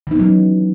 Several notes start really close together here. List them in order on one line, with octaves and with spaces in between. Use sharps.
E3 D#4 B3 F#3 C#4